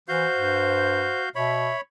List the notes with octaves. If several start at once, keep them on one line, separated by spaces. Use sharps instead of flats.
E3 F#4 C5 F5 G6
G2
B2 C#5 E5 B5